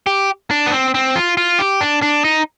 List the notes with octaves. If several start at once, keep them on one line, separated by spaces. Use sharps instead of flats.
G4
D4
B3
C4
C4
F4
F4
G4
D4
D4
D#4